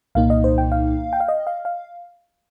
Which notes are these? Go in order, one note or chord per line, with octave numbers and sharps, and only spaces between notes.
C2 A#2 A#3 D#4 F5
D#5
C5
G5
F5
G5
F5
D#5
F5
F5